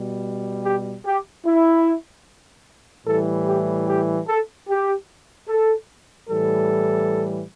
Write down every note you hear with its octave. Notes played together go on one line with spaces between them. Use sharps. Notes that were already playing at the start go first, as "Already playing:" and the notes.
Already playing: B2 G3
G4
G4
E4
A2 E3 G3 A4
G4
G4
A4
G4
A4
A2 E3 G3 A4